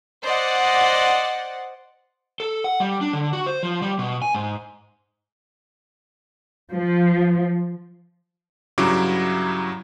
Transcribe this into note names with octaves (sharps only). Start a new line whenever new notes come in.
C5 D5 D#5 F#5
A4
F#5
G3
D4
D3
F#4
C5
F3
G3
B2
G#5
G#2
F3
G2 C#3 F#3 E4 A#5 D6